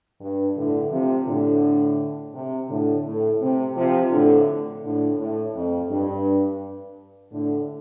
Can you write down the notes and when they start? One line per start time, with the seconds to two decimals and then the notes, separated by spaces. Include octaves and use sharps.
0.21 G2
0.56 A2 D3
0.91 C3 F3
1.27 A2 D3
2.34 C3
2.69 A2 D3
3.05 A2
3.40 C3
3.76 C3 F3
4.11 A2 D3
4.83 A2 D3
5.18 A2
5.54 F2
5.89 G2
7.32 A2 D3